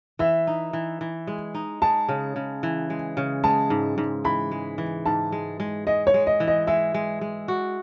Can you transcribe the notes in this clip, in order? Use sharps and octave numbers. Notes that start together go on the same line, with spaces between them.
E3 E5
D#4
E3
E3
G#3
D#4
G#3 A5
C#3
C#3
E3
G#3
C#3
G#3 A5
G#2
G#2
E3 B5
G#3
E3
G#2 A5
G#3
G#3
G#3 D#5
C#5
G#3
D#5
E3
D#5
G#3 E5
G#3
G#3
F#4